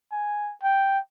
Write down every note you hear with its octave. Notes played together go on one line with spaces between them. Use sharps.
G#5
G5